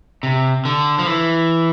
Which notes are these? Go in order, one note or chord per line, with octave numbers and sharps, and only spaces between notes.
C3
D3
F3
E3